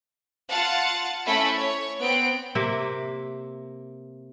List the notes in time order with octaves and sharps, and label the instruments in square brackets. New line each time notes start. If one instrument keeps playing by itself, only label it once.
[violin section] F4 F5 F#5 A5 A6 C#7
A3 C#4 E4 A4 B5 C#7
C#5
B3 C4 D7
[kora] C3 A#3 E5